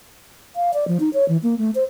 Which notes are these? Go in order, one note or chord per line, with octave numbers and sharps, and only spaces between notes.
F5
D5
F3
D#4
C#5
E3
A#3
A3
C5